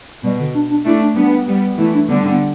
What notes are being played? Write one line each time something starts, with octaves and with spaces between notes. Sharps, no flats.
B2 G3
D3
D4
D4
A3 D4 E4
D4
G3 B3 D4
G3 B3
E3 A3 E4
D4
D3 G3 B3
B3